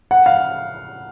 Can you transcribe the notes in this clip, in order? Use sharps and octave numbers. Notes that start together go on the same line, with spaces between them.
F#5
F5